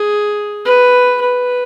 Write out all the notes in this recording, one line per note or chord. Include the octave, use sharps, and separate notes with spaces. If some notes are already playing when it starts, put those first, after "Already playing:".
Already playing: G#4
B4
B4